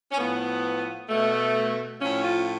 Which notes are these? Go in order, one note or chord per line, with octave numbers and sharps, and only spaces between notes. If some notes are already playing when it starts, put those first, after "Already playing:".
C#4
A2 F3 B3
B2 A3
A2 F3 C#4
F4